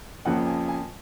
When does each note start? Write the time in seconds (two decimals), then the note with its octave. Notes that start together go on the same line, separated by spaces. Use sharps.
0.25 F2 C#3 F3 A#3 F#5
0.47 G#5
0.68 G#5